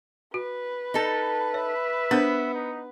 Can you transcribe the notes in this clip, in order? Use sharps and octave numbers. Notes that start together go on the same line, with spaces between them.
F#4 B4
D#4 A4
C#5 E5
B3 D4 A#4 C5
D#4